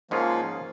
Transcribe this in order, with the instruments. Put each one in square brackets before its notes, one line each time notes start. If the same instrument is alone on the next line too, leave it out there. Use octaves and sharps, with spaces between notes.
[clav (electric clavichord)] G#2 G#3 C#4 F4 G#4 [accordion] F3 A#3